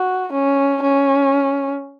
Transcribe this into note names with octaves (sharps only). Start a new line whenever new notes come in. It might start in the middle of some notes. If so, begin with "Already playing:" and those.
Already playing: F#4
C#4
C#4